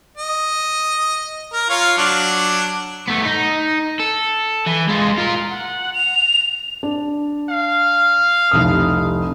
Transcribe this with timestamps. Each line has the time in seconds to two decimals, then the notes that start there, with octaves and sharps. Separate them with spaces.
0.17 D#5
1.53 A#4
1.70 F4 C#5 F5
1.97 F#3 D4
3.08 A3 B3
3.25 D#4
3.99 A4
4.67 E3
4.89 G#3 F4
5.18 F4 A#4
5.50 F#5
5.94 F7
6.83 D4
7.49 F5
8.51 F1 C2 D#6